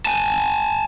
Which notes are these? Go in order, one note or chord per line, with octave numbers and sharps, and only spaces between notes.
G#5 A5